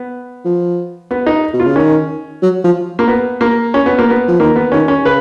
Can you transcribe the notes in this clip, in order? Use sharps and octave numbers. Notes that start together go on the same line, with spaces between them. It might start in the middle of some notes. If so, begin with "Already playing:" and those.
Already playing: B3
F3
B3
D#4
B2
F4
C#3
D#3 C#4
F#3
F3
A#3
B3
A#3
C#4
B3
A#3
B3
F3
D#3 A#3
B3
D#3 C#4
C#4
C#3 B4